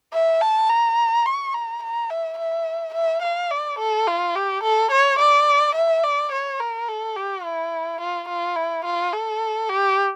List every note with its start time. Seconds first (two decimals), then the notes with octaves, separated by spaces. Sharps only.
0.14 E5
0.41 A5
0.70 A#5
1.26 C#6
1.54 A#5
1.83 A#5
2.10 E5
2.38 E5
2.95 E5
3.23 F5
3.51 D5
3.79 A4
4.07 F4
4.36 G4
4.63 A4
4.91 C#5
5.19 D5
5.75 E5
6.04 D5
6.32 C#5
6.60 A#4
6.88 A4
7.16 G4
7.44 E4
8.01 F4
8.28 F4
8.56 E4
8.85 F4
9.13 A4
9.69 G4